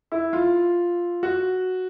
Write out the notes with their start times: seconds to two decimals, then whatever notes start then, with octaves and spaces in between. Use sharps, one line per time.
0.12 E4
0.33 F4
1.23 F#4